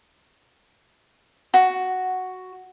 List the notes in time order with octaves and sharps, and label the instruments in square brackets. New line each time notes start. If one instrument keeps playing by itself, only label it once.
[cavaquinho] F#4